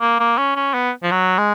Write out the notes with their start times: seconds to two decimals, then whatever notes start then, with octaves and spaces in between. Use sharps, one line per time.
0.01 A#3
0.20 A#3
0.38 C#4
0.56 C#4
0.74 B3
1.03 F3
1.11 F#3
1.38 G#3